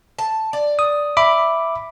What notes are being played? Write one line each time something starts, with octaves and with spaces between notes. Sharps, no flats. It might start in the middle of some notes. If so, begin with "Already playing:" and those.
A5
D5
D#6
E5 B5 D6